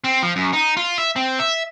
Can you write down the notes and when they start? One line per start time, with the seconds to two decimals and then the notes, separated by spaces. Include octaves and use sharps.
0.04 C4
0.23 F3
0.36 F#2
0.53 D#4
0.77 F4
0.98 E5
1.16 C4
1.39 E5